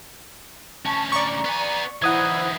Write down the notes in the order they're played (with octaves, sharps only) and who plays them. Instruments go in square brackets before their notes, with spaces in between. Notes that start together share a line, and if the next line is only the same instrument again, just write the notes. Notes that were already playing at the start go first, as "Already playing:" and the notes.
[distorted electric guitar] D2 C#4 [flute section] A5 C#6
[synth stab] D5 C#6 [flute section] A#5
[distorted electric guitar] B3 G#5
[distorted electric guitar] E3 D#4 [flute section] E4 C5 [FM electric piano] F#5 D#6 G#6